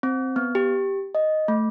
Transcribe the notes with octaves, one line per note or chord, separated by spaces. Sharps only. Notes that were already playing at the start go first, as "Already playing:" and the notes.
C4
B3
G4
D#5
A3